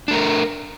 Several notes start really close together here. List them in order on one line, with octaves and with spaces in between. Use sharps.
D4 A3 A#4